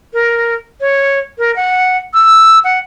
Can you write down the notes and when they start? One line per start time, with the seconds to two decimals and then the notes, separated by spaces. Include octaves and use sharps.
0.13 A#4
0.81 C#5
1.38 A#4
1.56 F#5
2.14 E6
2.64 F#5